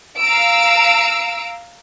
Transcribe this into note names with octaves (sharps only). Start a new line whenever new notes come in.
F5 A#5 E6 D7